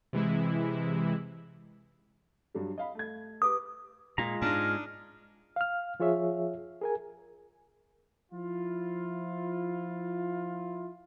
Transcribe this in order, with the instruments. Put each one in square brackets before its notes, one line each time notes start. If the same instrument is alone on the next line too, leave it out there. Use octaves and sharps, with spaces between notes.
[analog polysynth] C3 E3 G#3 E4
[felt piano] G2 F#3 G3
D#5 F5 B5
A3 G#6
[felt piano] G4 B4 D6 [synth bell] D#6
[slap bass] A#2 [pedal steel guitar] G#3 F4 A#5
[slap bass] G#2 [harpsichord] D4 D#4 [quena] F6
[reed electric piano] F5 F6
F3 F4 G#4 C#5 E5
G#4 A#4 G#5
[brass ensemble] F3 E4 F4